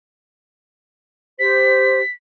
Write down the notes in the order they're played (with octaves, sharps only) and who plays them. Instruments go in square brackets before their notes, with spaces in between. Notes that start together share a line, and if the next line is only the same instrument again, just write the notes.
[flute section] G4 C5 [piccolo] B6